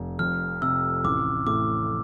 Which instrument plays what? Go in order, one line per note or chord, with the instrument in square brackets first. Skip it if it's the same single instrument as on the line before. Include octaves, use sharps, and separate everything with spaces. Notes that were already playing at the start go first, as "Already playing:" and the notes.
Already playing: [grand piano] F1
[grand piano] F2 [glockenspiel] F6
[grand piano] C3 [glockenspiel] E6
[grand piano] A1 [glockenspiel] D6
[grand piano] A2 [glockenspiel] D6